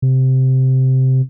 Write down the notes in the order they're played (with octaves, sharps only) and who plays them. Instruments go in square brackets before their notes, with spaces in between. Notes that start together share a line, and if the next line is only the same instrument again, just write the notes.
[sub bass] C3